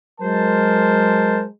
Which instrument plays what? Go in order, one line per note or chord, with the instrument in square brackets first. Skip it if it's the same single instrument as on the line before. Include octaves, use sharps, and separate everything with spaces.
[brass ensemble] F#3 G#3 A#4 C5 A5